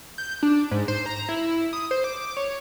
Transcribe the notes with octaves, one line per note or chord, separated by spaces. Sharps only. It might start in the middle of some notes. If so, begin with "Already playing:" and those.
G6
D4
G#2
C5
A#5
E4
D#6
C5
D6
D6
C#5